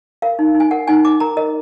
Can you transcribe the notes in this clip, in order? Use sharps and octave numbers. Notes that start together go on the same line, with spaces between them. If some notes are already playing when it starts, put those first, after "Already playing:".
A#4 F5
D#4
D#4
G#5
A#4 F#5
D#4 G#5
D#4 D6
A#4 A#5
A#4 D#5